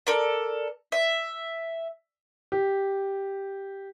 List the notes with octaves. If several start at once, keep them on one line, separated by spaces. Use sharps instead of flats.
A4 A#4 D5
E5
G4